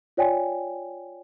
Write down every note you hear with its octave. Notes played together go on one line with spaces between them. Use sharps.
F4 C#5 D5 G5 G#5